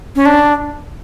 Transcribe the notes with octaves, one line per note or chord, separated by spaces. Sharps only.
C#4
D4